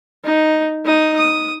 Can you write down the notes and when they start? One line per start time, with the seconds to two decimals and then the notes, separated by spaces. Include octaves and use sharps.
0.24 D#4
0.85 D#4 D#6
1.16 D#6